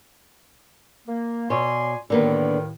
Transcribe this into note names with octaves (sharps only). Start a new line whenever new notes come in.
A#3
B2 C#5 D5 G#5 C6
D#2 A2 D3 D#3 A#3 B3